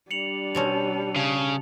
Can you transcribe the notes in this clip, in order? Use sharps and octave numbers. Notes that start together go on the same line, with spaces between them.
G3 D4 C#7 F7 F#7
B2 C4 C#4 A5 F7
C#3